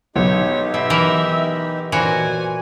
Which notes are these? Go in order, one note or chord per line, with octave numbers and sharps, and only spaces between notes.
B1 D#4 G4 C#5
B2 E5
E3 A#4
A#2 E3 F#4 C5 G#5